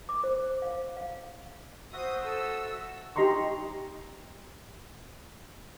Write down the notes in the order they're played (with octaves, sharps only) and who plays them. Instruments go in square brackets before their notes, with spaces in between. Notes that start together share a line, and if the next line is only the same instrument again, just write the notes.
[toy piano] D6
C5
F5
F5
[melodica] F#4 E5 [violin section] C5 D#6
[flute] A4 [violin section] E6
[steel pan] D#4 G4 D#5 A#5 C6 C#6